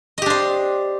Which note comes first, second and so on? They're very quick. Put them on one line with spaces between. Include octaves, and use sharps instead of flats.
D#5 G4 D4 C5